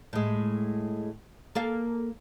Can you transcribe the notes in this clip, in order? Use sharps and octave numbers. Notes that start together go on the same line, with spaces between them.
A2 G#3
A#3 A4 F5